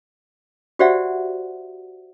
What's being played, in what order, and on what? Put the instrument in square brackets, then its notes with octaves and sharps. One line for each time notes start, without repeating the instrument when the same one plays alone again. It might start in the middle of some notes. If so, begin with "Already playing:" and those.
[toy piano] F#4 G4 C5 D5 E5 F#5